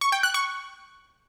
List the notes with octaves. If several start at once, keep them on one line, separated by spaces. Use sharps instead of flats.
C#6
G5
F#6
C#6